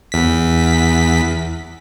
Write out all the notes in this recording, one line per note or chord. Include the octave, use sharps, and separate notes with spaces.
E2 B6